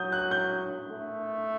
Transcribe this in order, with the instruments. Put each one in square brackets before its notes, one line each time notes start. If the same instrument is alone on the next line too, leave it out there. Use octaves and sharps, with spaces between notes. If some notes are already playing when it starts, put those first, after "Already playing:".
Already playing: [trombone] F#3 [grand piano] D#6 G6
[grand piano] F#6
G6
[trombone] A3